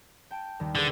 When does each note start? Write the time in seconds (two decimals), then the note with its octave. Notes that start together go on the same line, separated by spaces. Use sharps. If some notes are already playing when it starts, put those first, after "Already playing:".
0.31 G5 A5 D7
0.59 D#2 D#3 G3
0.75 D3 G#4 B4